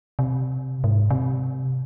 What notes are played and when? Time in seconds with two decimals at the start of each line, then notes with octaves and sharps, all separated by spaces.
0.19 C3
0.84 G#2
1.10 C3